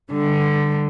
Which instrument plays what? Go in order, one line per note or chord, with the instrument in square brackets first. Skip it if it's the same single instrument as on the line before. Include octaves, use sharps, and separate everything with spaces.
[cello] D3 G3